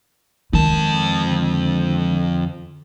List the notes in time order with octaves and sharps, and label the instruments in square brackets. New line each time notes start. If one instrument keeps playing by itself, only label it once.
[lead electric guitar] F2 A5 [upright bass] D#3 G#3
[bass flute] D3